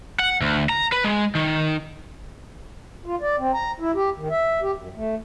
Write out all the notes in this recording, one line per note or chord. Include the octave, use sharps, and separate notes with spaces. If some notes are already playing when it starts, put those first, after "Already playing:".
F#5
D2
A#5
B4
G#3
D#3
F4
D5
C4
A#5
E4
G4
D#3
E5
G4
F#2
A3